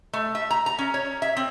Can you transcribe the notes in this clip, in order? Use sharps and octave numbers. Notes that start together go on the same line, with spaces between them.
A3
E5
A#5
A#5
C#4
C#5
E5
C4